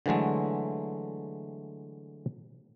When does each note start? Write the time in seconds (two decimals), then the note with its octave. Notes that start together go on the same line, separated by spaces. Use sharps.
0.06 D3 E3 F#3 G#3 A3